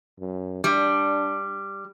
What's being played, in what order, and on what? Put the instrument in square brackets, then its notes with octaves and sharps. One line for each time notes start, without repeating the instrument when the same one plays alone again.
[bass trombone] F#2
[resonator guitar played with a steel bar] G3 [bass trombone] D4